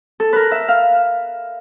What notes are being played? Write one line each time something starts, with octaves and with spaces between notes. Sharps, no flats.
A4
A#4 B4
E5
F5